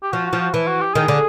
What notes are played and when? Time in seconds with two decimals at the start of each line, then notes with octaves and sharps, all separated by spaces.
0.03 G4
0.12 F3 F#4
0.26 F#4
0.33 F3
0.40 F#4
0.54 E3 E4
0.68 F#4
0.81 G4
0.94 D#3 G#4
1.08 D3